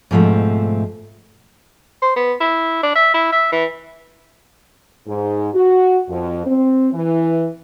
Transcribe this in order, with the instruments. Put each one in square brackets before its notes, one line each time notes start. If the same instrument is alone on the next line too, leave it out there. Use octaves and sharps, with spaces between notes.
[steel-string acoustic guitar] G#2 B2 F3 G3 A3 C4
[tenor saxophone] C5
B3
E4
D4
E5
E4
E5
E3
[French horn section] G#2
F#4
F2
C4
E3